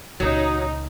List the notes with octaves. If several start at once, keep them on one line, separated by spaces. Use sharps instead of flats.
C#2 A#2 F#3 D#4